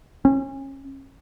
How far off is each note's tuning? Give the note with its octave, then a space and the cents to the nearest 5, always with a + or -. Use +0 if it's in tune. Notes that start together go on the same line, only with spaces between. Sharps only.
C#4 -30